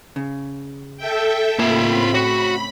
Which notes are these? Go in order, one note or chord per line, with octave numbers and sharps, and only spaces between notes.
C#3
A4 E5 G5
A2 C#3 A#3 C4 F4 E5 B5
F#4 C#5